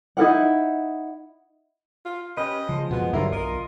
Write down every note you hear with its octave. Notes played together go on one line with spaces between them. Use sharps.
D#4 E4 A#4 F#5
F4
C#4 G4 B4 D#5
C#3 F3 G#3
F#2 B2 B3
G2 D3 F#3 E4 F4 A#4
B1 F4 A#4 D#5